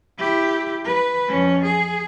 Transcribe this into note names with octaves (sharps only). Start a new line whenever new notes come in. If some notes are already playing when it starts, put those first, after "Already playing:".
E4 G4
B4
F2 C#4
G#4